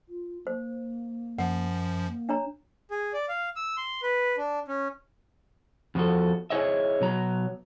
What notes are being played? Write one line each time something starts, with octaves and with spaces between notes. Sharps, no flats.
F4
A#3 C5
F#2 F3 F#5
A#3
D4 C#5 A#5
G#4
D5
F5
E6
C6
B4
D4
C#4
E2 F3 F#4 A4
E4 F#4 G#4 C#5 D#5 E5
B2 F#3 A#5